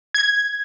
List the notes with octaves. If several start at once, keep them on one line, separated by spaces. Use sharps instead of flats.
G#6